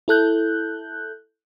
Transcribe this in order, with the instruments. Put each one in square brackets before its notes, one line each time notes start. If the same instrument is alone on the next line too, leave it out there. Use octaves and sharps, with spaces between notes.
[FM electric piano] E4 A4 F#6 G6